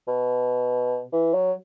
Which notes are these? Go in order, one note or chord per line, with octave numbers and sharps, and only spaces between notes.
B2
E3
F#3